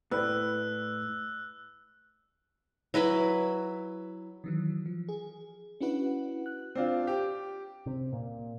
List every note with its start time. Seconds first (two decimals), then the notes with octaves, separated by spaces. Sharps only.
0.11 A2 B4 D5 B5 E6 F#6
2.94 F#3 E4 B4 B5
4.44 D#3 E3 F#3
4.86 F3
5.09 G#4
5.81 C#4 D4 E4 F#4 B4 F#5
6.46 F#6
6.75 C4 D4 F4
7.07 G4
7.86 C3
8.13 A#2